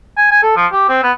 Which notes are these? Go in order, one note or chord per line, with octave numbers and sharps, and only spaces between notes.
G#5
G#5
A4
F3
G4
C4
B3